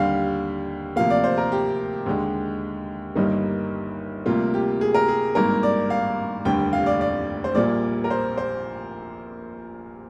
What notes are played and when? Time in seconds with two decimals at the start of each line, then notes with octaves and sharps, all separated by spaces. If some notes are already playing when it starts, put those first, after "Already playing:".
Already playing: D#2 D3 G3 F5
0.96 D2 C3 F3 A#3 F5
1.10 D5
1.24 C5
1.38 A#4
1.52 G4
2.06 D#2 D3 G#3
3.15 G1 G2 D#3 G3 A#3 D#4
4.26 D2 C3 G3 A#3 F4
4.54 G4
4.81 G#4
4.94 A#4
5.08 G#4
5.35 G#1 G2 D#3 A#3 A#4
5.63 D5
5.90 F5
6.45 F1 D#2 D3 G3 G5
6.73 F5
6.86 D5
7.01 D5
7.44 C5
7.55 A#1 A#2 G3 A#3 D5
8.04 A#4
8.10 C5
8.38 C5